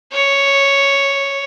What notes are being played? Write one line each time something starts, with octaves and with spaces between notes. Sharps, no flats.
C#5